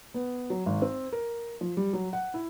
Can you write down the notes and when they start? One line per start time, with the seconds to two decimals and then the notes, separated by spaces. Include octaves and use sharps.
0.14 B3
0.50 F#3
0.66 G#1
0.82 C4
1.13 A#4
1.61 F3
1.77 G3
1.93 F#3
2.13 F#5
2.34 E4